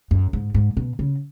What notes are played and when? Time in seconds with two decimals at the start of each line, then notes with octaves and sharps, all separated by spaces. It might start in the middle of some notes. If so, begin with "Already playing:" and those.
0.11 F#2
0.33 G#2
0.54 G#2
0.77 B2
0.99 C#3